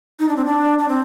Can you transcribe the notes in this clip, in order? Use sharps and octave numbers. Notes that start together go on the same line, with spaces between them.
D#4
D4
C4
D4
D4
C4